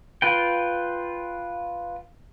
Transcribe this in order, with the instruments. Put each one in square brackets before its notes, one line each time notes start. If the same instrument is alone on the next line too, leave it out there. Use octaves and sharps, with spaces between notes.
[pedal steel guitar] F4 B4 G5